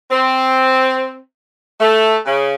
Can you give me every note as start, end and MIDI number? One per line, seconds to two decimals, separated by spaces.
0.10 1.16 60
1.79 2.16 57
2.25 2.53 49